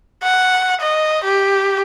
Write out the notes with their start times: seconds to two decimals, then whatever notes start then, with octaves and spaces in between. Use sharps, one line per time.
0.23 F#5
0.81 D#5
1.24 G4